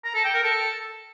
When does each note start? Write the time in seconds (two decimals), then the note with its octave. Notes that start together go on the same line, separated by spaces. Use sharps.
0.05 A#5
0.14 A4
0.24 G5
0.34 A#4
0.44 A4